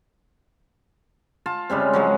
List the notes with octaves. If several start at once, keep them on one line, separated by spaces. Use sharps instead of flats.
F4 A5
C#3 G3 G#3 C4
F3 F#3 G#3